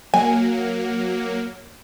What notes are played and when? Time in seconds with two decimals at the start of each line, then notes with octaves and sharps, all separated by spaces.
0.14 F#3 A#3 G#5